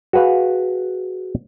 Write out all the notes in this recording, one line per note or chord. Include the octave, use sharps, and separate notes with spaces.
F#4 G#4 B4 F5